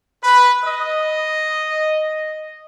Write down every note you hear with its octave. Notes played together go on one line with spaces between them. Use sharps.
B4
D#5